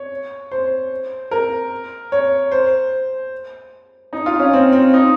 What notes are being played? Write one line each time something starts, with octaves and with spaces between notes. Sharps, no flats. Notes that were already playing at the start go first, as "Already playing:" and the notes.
Already playing: C#5
C5
A#4
C#5
C5
D#4
F4
C#4
C4
C4
D#4